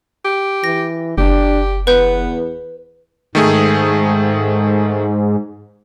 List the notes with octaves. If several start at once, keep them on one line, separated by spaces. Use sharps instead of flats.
G4
E3 A#6
F#1 D4 G4
E2 B3 B4 G6
G#2 D#3 A3 G#4